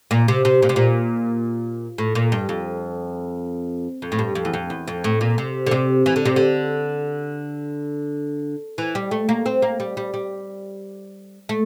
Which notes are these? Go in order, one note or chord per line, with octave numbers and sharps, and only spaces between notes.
A#2
C3
C3
A#2
C3
A#2
A2
A#2
G2
F2
F2
A2
G2
F2
E2
F2
E2
F2
A2
A#2
C3
D3
C3
E3
D3
C3
D3
E3
G3
A3
A#3
C4
A#3
G3
G3
G3
A3